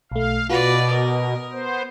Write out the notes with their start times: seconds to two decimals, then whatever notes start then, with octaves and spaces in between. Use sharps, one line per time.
0.12 B1 A3 F5
0.50 B2 F4 F#4 B4 D5 A#6
0.91 A#4 D#6
1.53 B3 C5